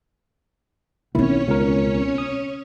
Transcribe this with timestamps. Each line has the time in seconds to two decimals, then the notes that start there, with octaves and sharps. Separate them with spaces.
1.15 B1 D#3 C4 C#4 E4 C#5
1.48 C#2 A#4
2.18 D#6